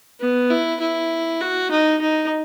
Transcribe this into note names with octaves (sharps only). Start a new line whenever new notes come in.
B3
E4
E4
F#4
D#4
D#4